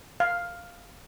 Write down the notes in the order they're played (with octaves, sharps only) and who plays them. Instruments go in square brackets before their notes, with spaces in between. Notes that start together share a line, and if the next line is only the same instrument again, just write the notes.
[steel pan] F5